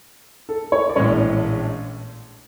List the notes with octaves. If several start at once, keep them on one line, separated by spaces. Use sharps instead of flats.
A4
C#5
D5
A#1 A2 E3 G#3 C#4 C#5